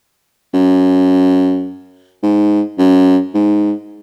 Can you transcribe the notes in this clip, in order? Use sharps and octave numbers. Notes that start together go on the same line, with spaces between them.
F#2
G#2
F#2
G#2